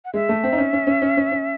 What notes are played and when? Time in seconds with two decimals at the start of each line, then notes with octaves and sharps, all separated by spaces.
0.05 F#5
0.14 G#3 E5
0.29 A3
0.43 C4
0.52 D#4
0.58 C#4
0.73 C#4
0.87 C#4
1.02 C#4
1.17 C#4
1.32 C#4